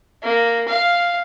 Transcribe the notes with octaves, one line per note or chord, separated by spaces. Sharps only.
A#3
F5